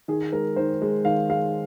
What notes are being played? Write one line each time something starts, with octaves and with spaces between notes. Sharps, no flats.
D#3 G#4
G#3 A#4
D#3 C5
G#3
D#3 F5
G#3 F5